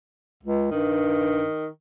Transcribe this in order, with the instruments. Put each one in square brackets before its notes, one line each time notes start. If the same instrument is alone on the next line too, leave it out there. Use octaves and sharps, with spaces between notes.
[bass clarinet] C#2
[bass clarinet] G2 [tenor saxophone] D#3